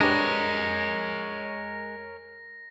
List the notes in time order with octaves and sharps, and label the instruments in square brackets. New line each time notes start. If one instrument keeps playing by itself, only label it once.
[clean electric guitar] G#3 [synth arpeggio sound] D4 G4 B4 [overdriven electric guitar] A#4 C#5 [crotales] A#6